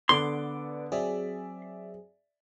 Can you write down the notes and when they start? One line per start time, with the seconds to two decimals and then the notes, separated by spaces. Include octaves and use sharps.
0.09 D3 B3 A4 B4 D5 C6 D6
0.92 F#3 C4 G#4 D5 E5